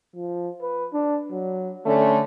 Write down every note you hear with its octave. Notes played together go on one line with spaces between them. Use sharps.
F3
B4
D4
F#3
D3 A3 C#4